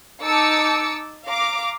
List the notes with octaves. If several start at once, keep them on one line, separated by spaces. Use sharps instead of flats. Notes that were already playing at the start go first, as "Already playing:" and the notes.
D#4 A5 D6 E6 C#7
F5 A#5 D6